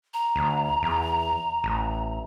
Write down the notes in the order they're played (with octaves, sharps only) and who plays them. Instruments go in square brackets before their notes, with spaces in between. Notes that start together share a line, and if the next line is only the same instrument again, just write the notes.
[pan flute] A#5
[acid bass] D2
E2
A1